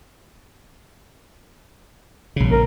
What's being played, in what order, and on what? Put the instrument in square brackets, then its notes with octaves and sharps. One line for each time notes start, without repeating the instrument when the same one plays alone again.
[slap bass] A#1 C#3
[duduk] A#4